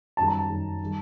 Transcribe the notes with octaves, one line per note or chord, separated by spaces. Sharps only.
F#2 D#3 G3 A5
A#5
A5
F#2 D#3 G3
D#3 G3